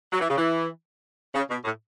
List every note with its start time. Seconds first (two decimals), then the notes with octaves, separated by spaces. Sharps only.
0.12 F#3
0.20 E3
0.29 C#3
0.37 E3
1.34 C#3
1.50 B2
1.64 A2